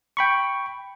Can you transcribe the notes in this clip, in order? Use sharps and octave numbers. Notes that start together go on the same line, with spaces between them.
G5 B5 C#6